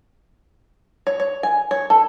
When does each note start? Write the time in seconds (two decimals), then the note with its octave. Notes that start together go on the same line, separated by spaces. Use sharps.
1.07 C#5
1.20 C#5
1.43 G#5
1.71 C#5
1.90 A4